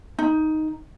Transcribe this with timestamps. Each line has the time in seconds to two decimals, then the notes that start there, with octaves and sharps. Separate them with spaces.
0.19 D#4